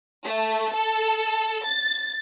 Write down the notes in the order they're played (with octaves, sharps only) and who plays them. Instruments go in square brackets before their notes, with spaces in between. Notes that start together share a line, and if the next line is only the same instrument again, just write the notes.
[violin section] A3
A4
A6